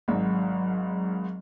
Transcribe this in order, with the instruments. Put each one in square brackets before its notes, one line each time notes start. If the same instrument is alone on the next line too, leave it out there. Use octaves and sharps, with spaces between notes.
[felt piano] G#1 G#2 [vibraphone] F#3